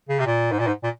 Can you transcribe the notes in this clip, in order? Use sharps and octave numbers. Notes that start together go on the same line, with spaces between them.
C#3
C3
A#2
G#2
A#2
G#2
A#2